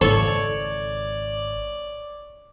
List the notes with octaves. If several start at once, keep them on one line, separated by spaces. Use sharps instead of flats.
G#1 C#3 A4 C#5 D5